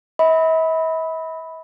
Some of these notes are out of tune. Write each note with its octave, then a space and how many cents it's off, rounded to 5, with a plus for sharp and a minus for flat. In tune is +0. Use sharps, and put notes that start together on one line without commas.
E5 -45 B5 +0